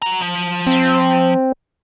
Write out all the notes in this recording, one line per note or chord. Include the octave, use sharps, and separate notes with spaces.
F#4 A#5
F3
C4